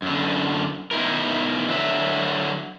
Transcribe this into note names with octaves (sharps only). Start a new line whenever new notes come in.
F#2 D3
B2 D#4 E4 A#4
D3 F#3 E5